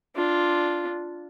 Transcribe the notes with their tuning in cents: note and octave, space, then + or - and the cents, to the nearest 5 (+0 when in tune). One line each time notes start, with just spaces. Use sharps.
D4 +0 F4 +0